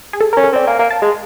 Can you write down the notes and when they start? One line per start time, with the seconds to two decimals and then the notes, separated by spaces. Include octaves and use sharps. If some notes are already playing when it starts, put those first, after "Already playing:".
0.13 G#4
0.21 A4
0.33 C#4 A#4
0.44 A4
0.52 C4 D5
0.67 A#3 G#5
0.79 A#3
0.91 A5
1.02 G#3